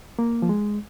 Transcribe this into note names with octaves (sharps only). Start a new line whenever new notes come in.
A#3
F3
G#3